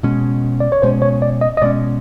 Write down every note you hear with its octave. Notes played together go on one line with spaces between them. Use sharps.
B2 G#3 C#4
D5
C#5
B2 G#3 C#4 C5
C#5
D5
D#5
D#5
B2 G#3 C#4 D5